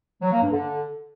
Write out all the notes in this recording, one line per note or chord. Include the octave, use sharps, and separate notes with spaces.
F#3
A#3
G2
D3